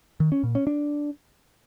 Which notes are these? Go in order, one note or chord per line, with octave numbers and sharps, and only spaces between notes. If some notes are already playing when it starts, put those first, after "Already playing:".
D#3
C#4
A#2
C#4
D4